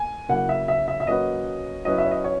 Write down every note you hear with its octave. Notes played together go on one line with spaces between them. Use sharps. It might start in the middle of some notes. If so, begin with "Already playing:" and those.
Already playing: A#3 G#5
C#3 F#3 A#3 E4 A#4 F#5
E5
E5
E5
E5
F#3 A#3 C#4 F#4 B4 D#5
F#3 C#4 E4 B4 D#5
E5
C#5
D#5
C#5